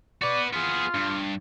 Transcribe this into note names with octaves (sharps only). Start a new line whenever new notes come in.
F#4 B4 D5
B3 F4 G#4
G2